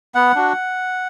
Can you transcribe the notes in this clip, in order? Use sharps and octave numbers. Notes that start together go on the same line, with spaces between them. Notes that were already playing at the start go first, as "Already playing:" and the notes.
B3 F#5
D4 F#4